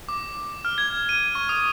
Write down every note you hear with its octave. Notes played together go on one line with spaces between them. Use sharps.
D6
F6
G#6
D#7
C#6
D#6